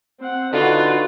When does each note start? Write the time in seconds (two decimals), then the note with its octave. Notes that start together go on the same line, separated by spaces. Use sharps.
0.20 C4 F#5
0.53 D3 D#4 F4 F#4 B4